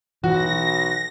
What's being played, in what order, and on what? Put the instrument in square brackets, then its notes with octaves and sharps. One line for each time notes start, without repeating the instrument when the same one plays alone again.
[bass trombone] B1 [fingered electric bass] E3 [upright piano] F#4 [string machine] A#6